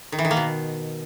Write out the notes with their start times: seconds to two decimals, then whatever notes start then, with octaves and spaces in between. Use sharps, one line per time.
0.12 D#3
0.18 E3
0.25 D#3
0.31 A#3
0.37 B2